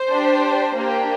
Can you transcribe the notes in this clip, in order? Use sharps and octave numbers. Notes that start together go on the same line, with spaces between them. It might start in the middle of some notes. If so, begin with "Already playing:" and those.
Already playing: C5
D4 G4
A#3 D4 G4